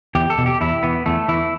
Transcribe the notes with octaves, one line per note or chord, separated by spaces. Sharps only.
E2 G4
A4
B2
G4
E2 E4
E3 B3
E2 A3
E3 E4